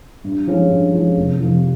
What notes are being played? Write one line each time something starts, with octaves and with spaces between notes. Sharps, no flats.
G2
F3 G#3 C#4
G2
F3 G#3 C#4
F1
F2 C3 F3